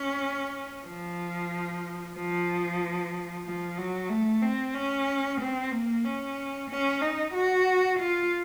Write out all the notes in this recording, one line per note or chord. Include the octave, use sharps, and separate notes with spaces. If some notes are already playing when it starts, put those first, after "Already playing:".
Already playing: C#4
F3
F3
F3
F#3
A3
C4
C#4
C4
A#3
C#4
C#4
D#4
F#4
F4